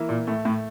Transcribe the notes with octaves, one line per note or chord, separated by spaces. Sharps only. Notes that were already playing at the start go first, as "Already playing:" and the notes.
Already playing: E3 A#3 E4
A#2
A2 A3
A2